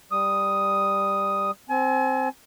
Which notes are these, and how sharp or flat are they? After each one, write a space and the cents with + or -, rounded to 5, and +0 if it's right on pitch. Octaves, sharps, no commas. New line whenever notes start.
G3 +5 D#6 +0
C4 +0 G#5 +35